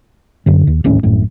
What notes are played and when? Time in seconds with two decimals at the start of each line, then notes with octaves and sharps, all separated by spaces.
0.46 F#2 D3
0.67 D#2
0.84 D1 G#1 A2 C#4
1.03 A#1 F#2 A2